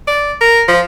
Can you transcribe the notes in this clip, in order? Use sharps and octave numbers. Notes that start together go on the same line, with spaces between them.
D5
A#4
F3